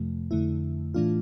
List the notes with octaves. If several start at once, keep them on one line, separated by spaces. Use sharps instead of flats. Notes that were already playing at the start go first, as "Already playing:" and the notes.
Already playing: F2 C3 F3 A3
F2 D3 A3 E4
A2 E3 A3 D4 F4